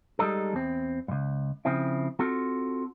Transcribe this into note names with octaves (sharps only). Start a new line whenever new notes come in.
G3 G#3 D#4 A4
E2 C4
C#2 G2
C#3 F3 C4 E4
C4 F4 F#4 A4